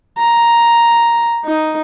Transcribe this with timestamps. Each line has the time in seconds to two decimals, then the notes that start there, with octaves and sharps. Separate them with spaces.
0.19 A#5
1.44 D#4